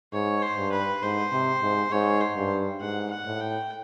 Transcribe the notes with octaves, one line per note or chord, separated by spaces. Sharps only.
G#2 C#5
C5
G2
B4
G#2 C5
C3
G#2
G#2 C#5
C5
G2
G#2 F#5
F#5
A2
G5